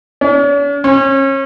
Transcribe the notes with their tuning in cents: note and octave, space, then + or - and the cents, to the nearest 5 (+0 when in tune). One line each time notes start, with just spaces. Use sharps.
C#4 +45
C#4 -35